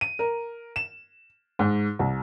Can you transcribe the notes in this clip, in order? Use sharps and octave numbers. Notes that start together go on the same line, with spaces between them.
D#7
A#4
E7
G#2
C2